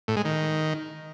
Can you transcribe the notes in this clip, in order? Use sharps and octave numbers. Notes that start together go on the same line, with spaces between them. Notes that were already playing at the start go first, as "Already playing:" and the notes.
A2
G#3
D#3